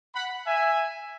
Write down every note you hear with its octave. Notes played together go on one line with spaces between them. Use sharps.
F#5 B5
E5 G#5